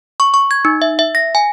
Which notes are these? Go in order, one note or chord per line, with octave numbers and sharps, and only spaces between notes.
C#6
C#6
G#6
D#4
E5
E5
A#6
G#5